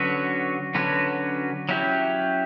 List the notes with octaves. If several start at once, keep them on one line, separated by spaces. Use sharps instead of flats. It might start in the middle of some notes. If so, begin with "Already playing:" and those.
Already playing: D3 F#3 C#4 F#4 B4
D3 F#3 C#4 F#4 B4
F#3 C#4 E4 G4